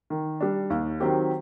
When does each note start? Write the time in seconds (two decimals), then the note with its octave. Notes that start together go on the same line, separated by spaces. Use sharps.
0.10 D#3
0.41 G3 D4
0.70 D#2
1.00 D#3 F#3 C4 G4